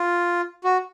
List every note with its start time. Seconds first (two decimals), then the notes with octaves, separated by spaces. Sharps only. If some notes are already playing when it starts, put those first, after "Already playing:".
Already playing: F4
0.64 F#4